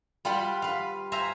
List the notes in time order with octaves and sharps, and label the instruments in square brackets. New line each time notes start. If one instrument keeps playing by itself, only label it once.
[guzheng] G3 F4 G4 B4 F#5 B5
B4 F5
C5 E5 F5 G#5 A#5